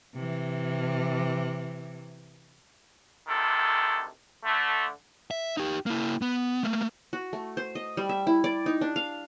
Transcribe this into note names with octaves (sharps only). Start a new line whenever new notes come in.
C3 E3
D2 C3 D#3 A4
D3 A3
E5
D#4 G4
A#3 E4
B3
A3 A#3
F#4
A3
C5
D#5
G3
E5
E4
D5
D#4
D4
F5